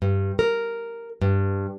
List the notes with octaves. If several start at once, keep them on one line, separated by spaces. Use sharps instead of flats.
G2
A#4
G2